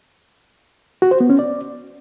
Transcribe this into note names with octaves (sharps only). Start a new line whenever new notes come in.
F#4
C5
B3
C#4
D5